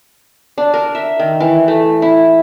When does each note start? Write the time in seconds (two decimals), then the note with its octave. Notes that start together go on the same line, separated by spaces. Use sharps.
0.58 D4
0.74 A#4
0.95 E5
1.19 D#3
1.40 E3
1.68 A3
2.02 E4